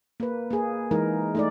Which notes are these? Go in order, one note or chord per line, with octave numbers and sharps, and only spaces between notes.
A#3 B4
A#3 G#4
E3 G#3 D#4 A#4
A3 D#4 D5